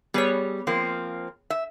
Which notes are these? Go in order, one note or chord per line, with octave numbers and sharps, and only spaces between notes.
G3 B3 G#4 C#5
F3 A#3 C4
E5